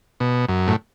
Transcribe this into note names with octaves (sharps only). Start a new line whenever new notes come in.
B2
F#2
A2